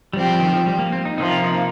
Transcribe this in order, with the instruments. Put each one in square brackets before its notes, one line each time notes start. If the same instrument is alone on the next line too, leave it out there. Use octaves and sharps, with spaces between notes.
[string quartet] F3 C4 G4 [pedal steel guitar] G3
[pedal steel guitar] G3
D#3
F3
G3
A#3
C4
D#4
[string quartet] C3 F3 A#3 [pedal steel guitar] D#4
[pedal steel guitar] F4
D#4